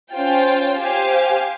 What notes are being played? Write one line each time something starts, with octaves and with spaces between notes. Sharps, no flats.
C#4 F4 C5 G5
G4 C5 F5 G#5